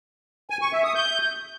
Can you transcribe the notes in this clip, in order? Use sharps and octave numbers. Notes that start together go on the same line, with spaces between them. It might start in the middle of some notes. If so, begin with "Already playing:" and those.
G#5
C#6
E5
D#6
G6